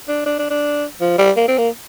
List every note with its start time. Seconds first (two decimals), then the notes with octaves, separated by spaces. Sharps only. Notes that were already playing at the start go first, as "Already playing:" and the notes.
0.08 D4
0.26 D4
0.39 D4
0.50 D4
1.01 F3
1.18 G3
1.37 A#3
1.48 C4
1.58 A#3